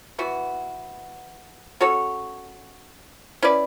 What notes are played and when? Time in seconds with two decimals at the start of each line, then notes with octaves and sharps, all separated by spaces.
0.18 E3 B3 F#4
1.80 C#4 F#4 A4 C#5
3.42 C#4 E4 B4 D5